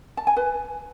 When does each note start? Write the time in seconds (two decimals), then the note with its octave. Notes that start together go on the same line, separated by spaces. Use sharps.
0.17 A5
0.27 G#5
0.37 B4